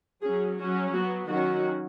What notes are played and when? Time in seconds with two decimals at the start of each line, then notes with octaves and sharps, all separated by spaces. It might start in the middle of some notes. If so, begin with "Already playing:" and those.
0.22 F#3 C#4 G#4
0.59 F#3 C#4 F#4
0.93 F#3 B3 F#4
1.28 D#3 F#3 C#4 F#4